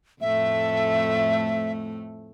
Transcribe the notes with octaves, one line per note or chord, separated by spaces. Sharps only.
F2 A2 A3 E5